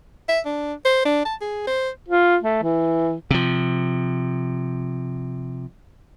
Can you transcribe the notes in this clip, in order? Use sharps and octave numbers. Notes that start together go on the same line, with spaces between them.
E5
D4
C5
D4
A5
G#4
C5
F4
A3
E3
C3 F3